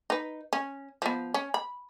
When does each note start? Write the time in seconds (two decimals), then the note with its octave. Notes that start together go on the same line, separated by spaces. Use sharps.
0.10 D#4 B4
0.53 C#4
1.02 F3 B3
1.34 C#4
1.54 B5